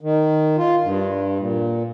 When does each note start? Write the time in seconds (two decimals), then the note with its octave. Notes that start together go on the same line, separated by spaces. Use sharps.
0.01 D#3
0.58 F4
0.83 G2
1.39 A#2